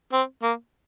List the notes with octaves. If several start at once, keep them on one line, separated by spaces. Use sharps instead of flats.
C4
A#3